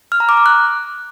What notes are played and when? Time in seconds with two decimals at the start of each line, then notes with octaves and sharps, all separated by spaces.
0.12 F6
0.20 A#5
0.29 D6
0.37 F6
0.46 F#6